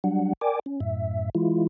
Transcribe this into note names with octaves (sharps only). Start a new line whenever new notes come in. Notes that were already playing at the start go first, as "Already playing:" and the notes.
F#3 G3 D4 F#5
A#4 D5 G5 G#5 D6
C#4
F#2 A2 E5
E3 G#3 E4 F4